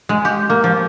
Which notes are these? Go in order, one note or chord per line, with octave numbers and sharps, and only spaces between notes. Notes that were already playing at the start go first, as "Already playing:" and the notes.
G#3
G4
A#3
F3